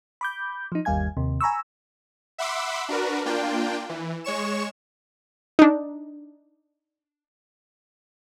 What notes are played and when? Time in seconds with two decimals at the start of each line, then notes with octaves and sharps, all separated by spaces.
0.21 B5 D6 G6
0.72 F3 D#4
0.85 G1 D#2 G3 F5 G#5 G#6
1.17 D#2 C3
1.41 G#5 A#5 B5 C#6 E6
2.38 E5 F#5 B5 C6 D6 E6
2.89 D4 F#4 A#4 B4
3.25 A#3 D4 F4 G5
3.89 E3
4.24 G#3 C#5 C#6 E7
5.59 D4 D#4